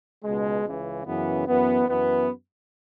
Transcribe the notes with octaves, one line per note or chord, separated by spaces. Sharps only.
C#2 B2 G#3
C#2 C#3 E3
F#2 C#3 E3 B3
F#2 E3 B3
F#2 E3 B3